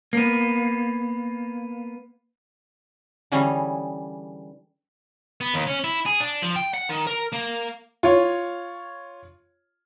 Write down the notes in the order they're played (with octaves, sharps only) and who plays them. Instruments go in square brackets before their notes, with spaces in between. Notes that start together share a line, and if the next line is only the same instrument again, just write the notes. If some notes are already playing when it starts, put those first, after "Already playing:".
[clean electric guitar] A#3 B3
[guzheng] D3 E3 G3 C#4 G#4
[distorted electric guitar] B3
D#2
C#4
E4
G#4
D4
F3
G5
F#5
D#3
A#4
A#3
[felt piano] F4 C#5